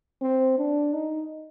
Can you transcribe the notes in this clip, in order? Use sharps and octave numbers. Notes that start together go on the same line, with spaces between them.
C4
D4
D#4